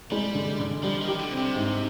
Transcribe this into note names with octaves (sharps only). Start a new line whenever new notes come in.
G3 G#3
D3
D3
F3 G3
D#3
G4
D3
C4
C3
G#2